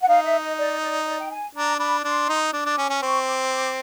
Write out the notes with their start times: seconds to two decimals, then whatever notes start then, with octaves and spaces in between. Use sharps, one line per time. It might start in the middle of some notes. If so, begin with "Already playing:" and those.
0.02 F#5
0.08 D#4 F5
0.24 E5
0.41 D#5
0.58 D5
0.82 D5
1.07 D5
1.20 G5
1.31 G#5
1.55 D4 A#5
1.79 D4 B5
2.04 D4 C6
2.29 D#4
2.53 D4 D6
2.66 D4
2.78 C#4
2.90 C#4
3.02 C4 C#6
3.26 D6
3.51 D6